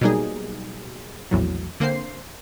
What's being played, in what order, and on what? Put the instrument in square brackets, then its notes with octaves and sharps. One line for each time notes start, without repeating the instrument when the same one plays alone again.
[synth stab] B2 F#3 G3 A#3 D#4 G#4
A#1 E2 A2 F#3
D3 A#3 C4 C5 C7